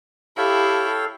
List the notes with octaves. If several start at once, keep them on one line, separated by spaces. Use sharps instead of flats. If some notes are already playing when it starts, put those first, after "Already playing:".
E4 G4 A4 C#5 F5 G5